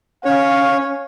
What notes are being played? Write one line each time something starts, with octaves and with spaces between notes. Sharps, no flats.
C#4 C#5 F5